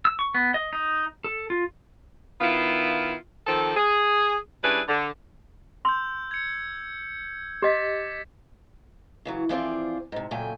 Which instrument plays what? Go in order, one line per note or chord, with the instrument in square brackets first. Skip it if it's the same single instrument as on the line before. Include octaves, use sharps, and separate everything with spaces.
[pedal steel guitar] E6
C#6
B3
D#5
D#4
A4
F4
[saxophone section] D#3 B3 E4 F4
D#3 F3 C4 A4
G#4
G3 C#4 D4 E4 G#4 B4
D3
[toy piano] C6 [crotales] E6 G6
[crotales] G#6 C#7
[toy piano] G4 D#5 [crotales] D6 A6 B6
[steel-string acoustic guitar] C#3 E3 F#3
E3 F3 C4 F4 G#4 D5
G#2 C3
A#2 C#3 F#3 A3 G5 G#5